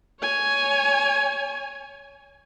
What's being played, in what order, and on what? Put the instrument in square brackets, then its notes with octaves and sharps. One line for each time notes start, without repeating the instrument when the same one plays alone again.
[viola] C#5 G#5